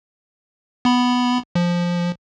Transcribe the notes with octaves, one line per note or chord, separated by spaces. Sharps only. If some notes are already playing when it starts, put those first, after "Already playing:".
B3 B5
F3